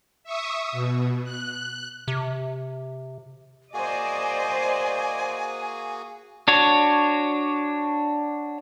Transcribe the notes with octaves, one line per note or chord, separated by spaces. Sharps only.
E5 C#6 D#6
B2
F#6
C3
A#3 F#4 G#4 C5 D5 D#5 G#5
D4 F#4 C#5